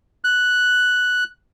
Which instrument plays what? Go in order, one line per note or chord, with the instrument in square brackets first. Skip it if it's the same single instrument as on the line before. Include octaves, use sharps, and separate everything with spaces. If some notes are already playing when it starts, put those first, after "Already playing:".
[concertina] F#6